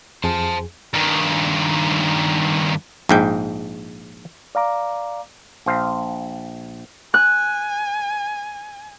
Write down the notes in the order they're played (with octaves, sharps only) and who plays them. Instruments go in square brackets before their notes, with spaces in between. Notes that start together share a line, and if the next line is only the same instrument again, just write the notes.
[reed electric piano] F2 G#4 [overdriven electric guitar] C5 A5
[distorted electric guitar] G2 D#3
[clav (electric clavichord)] A#1 G#2 G5
[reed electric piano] D5 F5 A#5 D6
[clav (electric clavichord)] A#1 C5 F5
[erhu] G#5 [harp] F#6